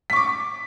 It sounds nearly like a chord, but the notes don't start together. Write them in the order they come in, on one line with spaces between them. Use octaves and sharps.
B6 C#6 D6